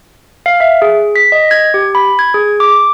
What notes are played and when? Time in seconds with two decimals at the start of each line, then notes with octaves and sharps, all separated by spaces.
0.46 F5
0.60 E5
0.82 G#4
1.16 B6
1.32 D#5
1.51 G#6
1.74 G4
1.95 B5
2.19 G#6
2.34 G#4
2.60 D6